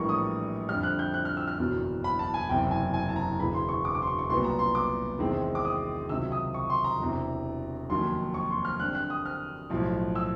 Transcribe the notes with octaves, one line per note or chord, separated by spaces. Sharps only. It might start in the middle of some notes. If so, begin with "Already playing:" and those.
Already playing: A#1 A2 E3 G3 A#3 C#6
D#6
F2 D3 G3 F6
F#6
G6
F#6
F6
E6
F6
F#1 E2 B2 F#3
B5
A5
G#5
F#1 E2 C3 G5
G#5
G#5
A5
A#5
E1 E2 C#3 E3 B5
C6
C#6
D6
D6
C6
C#6
C#6
C2 A#2 F#3 B3 C6
A#5
C6
D6
E2 C3 D#3 G#3 C4
D6
D#6
C#2 C3 D#3 F#3 E6
D#6
C#6
C6
A#5
E1 E2 C3
F1 D#2 D#3 F#3 C6
C#6
C6
F6
G2 D3 G3 C4 F#6
F#6
D#6
F6
B1 A2 F3
E6